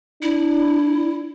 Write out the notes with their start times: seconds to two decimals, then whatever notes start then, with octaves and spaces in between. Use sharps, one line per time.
0.22 D4 E4